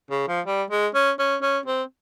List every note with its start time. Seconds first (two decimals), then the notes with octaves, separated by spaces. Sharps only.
0.11 C#3
0.28 F3
0.46 G3
0.71 G#3
0.95 C#4
1.19 C#4
1.42 C#4
1.66 C4